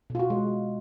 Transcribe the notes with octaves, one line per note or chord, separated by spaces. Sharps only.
B2 F4
F#4
G#3